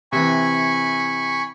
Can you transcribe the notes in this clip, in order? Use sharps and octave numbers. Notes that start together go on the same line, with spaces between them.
C3 E3 G#5 B5 C#6